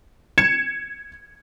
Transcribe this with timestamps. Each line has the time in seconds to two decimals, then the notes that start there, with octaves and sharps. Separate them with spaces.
0.38 G#6 C#7 E7